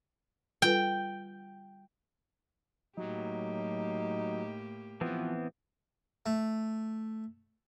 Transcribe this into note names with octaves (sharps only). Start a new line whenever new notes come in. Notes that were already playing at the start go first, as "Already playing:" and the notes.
G3 F4 B4 G5
A2 F#3 A#3 D#4 G4
E3 F3 B3 C4
A3